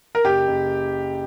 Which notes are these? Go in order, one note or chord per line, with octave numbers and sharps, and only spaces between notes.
A#4
F#1 G4
F#1